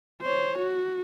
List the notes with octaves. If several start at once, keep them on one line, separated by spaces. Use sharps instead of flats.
C5 C#5
F#4